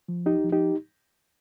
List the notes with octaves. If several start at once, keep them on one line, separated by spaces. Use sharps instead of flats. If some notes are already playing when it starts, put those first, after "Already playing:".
F3
C2 D#4 G4
F3
D#4 G4